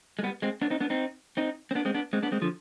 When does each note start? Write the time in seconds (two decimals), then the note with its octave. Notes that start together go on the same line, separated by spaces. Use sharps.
0.19 G#3
0.23 G3 B3
0.42 G#3 C4
0.61 B3 D4
0.70 C4 D#4
0.81 B3 D4
0.90 C4 D#4
1.37 C4 D#4
1.71 C4
1.75 B3 D4
1.85 G#3 C4
1.94 B3 D4
2.13 G#3 C4
2.23 B3 D4
2.32 G#3 C4
2.42 D3 F3